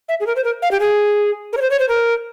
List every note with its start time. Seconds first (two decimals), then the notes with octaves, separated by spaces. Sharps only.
0.09 E5
0.20 G#4
0.27 A#4
0.36 C5
0.44 A#4
0.62 F5
0.71 G4
0.80 G#4
1.53 A#4
1.57 C#5
1.61 C5
1.70 C#5
1.79 C5
1.89 A#4